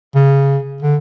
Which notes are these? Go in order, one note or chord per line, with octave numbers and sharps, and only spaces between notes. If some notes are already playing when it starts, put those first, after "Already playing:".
C#3
D3